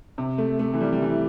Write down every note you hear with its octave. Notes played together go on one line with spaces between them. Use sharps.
C3
A3
A3
E3
G3
G3
E3